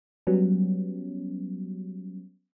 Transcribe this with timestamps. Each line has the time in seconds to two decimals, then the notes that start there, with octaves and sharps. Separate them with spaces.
0.27 F#3 G3 B3 C#4